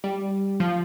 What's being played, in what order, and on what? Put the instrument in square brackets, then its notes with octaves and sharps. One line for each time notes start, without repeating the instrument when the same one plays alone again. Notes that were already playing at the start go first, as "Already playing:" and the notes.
[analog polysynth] G3
F3